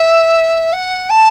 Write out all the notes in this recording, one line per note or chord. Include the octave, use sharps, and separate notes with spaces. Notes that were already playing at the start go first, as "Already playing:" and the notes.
Already playing: E5
F#5
A5